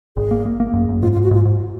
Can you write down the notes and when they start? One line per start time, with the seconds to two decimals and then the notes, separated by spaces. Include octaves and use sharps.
0.17 G#1 G#4
0.31 A#3
0.46 A#3
0.60 A#3
0.73 F#2
0.89 F#2
1.02 G#2 F4
1.13 F4
1.16 G#2
1.24 F#4
1.31 G#2 F4
1.45 G#2